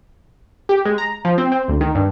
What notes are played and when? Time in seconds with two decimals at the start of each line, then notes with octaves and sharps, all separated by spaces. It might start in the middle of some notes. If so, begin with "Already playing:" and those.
0.69 G4
0.85 G#3
0.98 A#5
1.25 F3
1.38 C4
1.52 C4
1.68 D2
1.81 D#3
1.95 G2